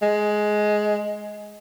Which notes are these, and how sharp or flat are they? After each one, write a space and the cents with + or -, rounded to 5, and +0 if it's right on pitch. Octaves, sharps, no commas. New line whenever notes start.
G#3 +15